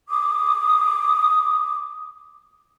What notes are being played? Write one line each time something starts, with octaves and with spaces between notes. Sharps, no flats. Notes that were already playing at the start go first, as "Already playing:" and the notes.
D6 D#6